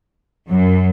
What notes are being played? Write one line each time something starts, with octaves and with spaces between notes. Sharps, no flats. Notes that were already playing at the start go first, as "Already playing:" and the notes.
F#2